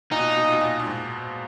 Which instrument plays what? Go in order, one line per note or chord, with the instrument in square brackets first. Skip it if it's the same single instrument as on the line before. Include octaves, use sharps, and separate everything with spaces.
[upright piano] A#2 [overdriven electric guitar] D#4
[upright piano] B2
A#2
B2
A#2
B2
A#2
A#2
G#2